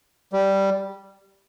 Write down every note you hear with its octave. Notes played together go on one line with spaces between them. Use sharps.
G3